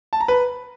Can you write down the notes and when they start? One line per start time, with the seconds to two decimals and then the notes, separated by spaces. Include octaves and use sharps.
0.13 A5
0.20 A#5
0.28 B4